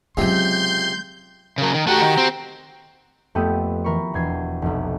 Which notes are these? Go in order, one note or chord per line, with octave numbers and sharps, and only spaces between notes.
C#2 C3 F#3 G#3 C4 C6 G6
C#3 F#3 A#4
D#3
A3 F#4 G4 F#5 A#5
D#3
C4
F2 A3 B3 G4 D#6
E3 A#4 B5 C#6
E1 E2 G#6 C7
F1 B1